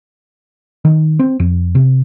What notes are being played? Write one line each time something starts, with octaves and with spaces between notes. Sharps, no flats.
D#3
C4
F2
C3